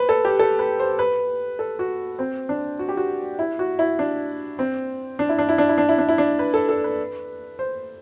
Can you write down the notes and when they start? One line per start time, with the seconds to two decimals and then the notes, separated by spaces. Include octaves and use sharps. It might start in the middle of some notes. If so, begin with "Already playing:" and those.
Already playing: B4 C5
0.09 A4
0.25 G4
0.39 A4
0.59 B4
0.79 C5
0.99 B4
1.59 A4
1.79 F#4
2.19 C4
2.49 D4
2.79 F#4
2.89 G4
2.97 F#4
3.39 E4
3.59 F#4
3.79 E4
3.99 D4
4.59 C4
5.19 D4
5.29 E4
5.39 D4
5.49 E4
5.58 D4
5.69 E4
5.78 D4
5.89 E4
5.98 D4
6.09 E4
6.18 D4
6.39 B4
6.54 A4
6.69 A4
6.84 B4
7.59 C5